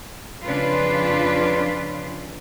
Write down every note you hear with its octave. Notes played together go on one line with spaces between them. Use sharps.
F2 C#3 C#4 D4 F4 B4